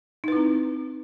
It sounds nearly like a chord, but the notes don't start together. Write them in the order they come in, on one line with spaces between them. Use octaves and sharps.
D#4 B4 E4 C4